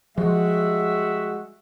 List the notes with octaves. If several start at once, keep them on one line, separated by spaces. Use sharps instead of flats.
F3 G3 G#3 F#4 E5